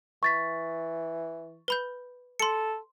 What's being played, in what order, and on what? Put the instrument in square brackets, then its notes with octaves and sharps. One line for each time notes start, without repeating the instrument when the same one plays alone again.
[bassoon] E3 [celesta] C#6 A6 B6
[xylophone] B4 B5 G6
[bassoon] A4 [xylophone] C6 C#7